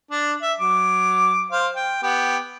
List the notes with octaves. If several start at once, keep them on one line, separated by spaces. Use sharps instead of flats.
D4
E5
F#3 D6
C5 F5
G5
B3 G4